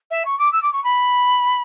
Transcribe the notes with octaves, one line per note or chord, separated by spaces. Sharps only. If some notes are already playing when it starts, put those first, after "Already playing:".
E5
C#6
D6
E6
D6
C#6
B5